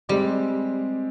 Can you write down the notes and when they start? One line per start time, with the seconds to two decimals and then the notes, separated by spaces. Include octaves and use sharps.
0.09 G3 G#3 C4 G4 D5